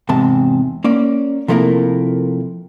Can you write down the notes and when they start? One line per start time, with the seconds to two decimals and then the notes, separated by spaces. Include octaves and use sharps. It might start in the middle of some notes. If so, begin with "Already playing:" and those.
0.09 E2 G#2 C3 A5
0.84 A#3 C#4 D5
1.48 C3 F3 A3 A#3 E4 A#4